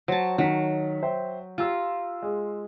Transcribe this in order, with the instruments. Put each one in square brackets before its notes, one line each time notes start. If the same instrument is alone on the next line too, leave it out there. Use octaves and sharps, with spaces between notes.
[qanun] F#3 A5 [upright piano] C5
[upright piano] D#3 B6 [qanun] F#3
[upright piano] C5 E5 G5
[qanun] F4 [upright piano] G4 A#5 E6
[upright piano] G#3 G#4